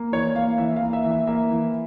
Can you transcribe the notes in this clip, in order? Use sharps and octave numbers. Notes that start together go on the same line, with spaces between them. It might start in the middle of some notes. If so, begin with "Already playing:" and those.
Already playing: A#3
E3 C#5
A#3 F5
E3 E5
F5
A#3
E5
E3
E5
A#3 E5
E3